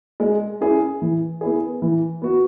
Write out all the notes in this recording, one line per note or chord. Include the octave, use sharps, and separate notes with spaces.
G#3
C#4 E4 G#4
E3
B3 E4 G#4
E3
B3 F#4